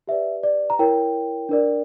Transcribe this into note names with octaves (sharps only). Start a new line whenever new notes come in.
G4 B4 D5 E5
D5
A#5
E4 A#4 C#5 G5
D4 A#4 D5